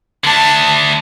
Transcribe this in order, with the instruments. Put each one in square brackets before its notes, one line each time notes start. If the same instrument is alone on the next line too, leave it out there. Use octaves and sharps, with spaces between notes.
[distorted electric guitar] D3 A3 [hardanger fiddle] A5